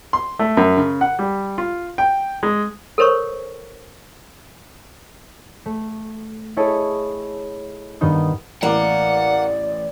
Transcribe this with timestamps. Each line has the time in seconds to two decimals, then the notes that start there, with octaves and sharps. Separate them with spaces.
0.13 C6
0.39 A3
0.57 F#2
0.77 C#3
1.01 F#5
1.19 G3
1.58 F4
1.98 G5
2.43 G#3
2.98 A4 A#4 C5 C#5 C#6
5.66 A3
6.57 E4 G#4 A4 C#5 D#5 A5
8.01 G2 D#3 B3 D#4 D#6
8.63 A1 A#3 D5 F#5 D6